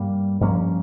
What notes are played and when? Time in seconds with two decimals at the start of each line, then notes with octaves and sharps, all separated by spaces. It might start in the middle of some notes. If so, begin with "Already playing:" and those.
Already playing: G2 G3 A#3
0.41 G2 F3 A#3 C#4